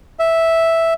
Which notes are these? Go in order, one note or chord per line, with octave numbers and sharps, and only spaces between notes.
E5